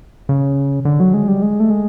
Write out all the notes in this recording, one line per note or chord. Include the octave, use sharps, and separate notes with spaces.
C#3
D3
F#3
G#3
G3
G#3
A3
G#3